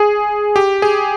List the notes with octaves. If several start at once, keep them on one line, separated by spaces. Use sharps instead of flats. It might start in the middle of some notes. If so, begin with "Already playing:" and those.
Already playing: G#4
G4
G#4